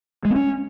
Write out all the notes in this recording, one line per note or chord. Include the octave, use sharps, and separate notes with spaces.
G#3
B3
C#4